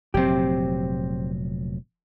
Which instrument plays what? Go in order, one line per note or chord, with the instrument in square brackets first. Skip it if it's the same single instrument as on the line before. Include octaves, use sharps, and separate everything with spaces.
[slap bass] F1 A#2 F#3 [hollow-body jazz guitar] C4 G4